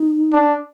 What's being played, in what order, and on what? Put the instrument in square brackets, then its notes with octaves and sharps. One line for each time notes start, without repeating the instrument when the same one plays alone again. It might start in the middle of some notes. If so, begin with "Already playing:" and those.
Already playing: [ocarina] D#4
[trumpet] D4